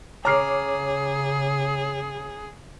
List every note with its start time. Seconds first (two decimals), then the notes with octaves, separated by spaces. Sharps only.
0.25 C#3 G#4 C#5 A#5 D6 F6 C7